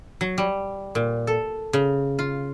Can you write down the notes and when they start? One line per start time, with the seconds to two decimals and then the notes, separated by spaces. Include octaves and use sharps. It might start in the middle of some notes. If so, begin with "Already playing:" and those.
0.21 F#3
0.38 G3
0.95 A#2
1.27 A4
1.73 C#3
2.19 F4